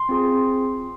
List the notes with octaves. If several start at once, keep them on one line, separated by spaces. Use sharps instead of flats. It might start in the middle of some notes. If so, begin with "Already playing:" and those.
Already playing: C6
C4 F4 G#4